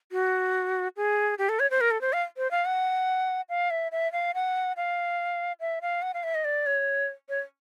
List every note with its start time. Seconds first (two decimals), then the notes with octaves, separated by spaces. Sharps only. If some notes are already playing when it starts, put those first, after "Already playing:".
0.12 F#4
0.97 G#4
1.38 G4
1.49 A4
1.60 C#5
1.70 C5
1.81 A#4
1.91 A4
2.01 C5
2.13 F5
2.37 C5
2.51 F5
2.65 F#5
3.49 F5
3.71 E5
3.92 E5
4.12 F5
4.35 F#5
4.77 F5
5.60 E5
5.82 F5
6.02 F#5
6.14 F5
6.23 E5
6.35 D#5
6.45 D5
6.66 C#5
7.29 C#5